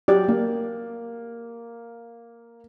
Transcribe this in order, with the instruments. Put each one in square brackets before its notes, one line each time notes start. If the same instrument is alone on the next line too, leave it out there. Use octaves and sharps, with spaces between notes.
[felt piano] F#3 [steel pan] G4 D5
[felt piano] A#3